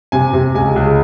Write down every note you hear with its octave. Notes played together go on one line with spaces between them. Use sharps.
C3 G#5
C3
C#2 G#5
C#2